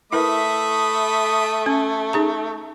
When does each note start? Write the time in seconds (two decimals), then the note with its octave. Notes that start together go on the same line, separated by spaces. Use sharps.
0.12 A3 E4 A#4 B4 E5 B5 D#6
1.66 C#4
2.13 D#4 G#4 A#5